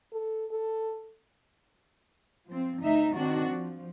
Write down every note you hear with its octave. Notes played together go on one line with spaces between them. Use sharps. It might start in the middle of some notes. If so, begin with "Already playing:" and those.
A4
A4
F3 C4
D2 D#4 E5
D#3 C4 D4 F#4
F3